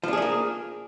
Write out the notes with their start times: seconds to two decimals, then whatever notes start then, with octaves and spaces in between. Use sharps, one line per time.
0.03 F3
0.08 D4
0.13 G#4
0.17 A3
0.22 A#3